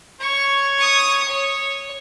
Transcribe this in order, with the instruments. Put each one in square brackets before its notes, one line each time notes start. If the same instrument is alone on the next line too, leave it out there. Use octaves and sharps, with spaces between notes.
[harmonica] C#5 [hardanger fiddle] C#6
[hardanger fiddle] C#6 D#6
C#5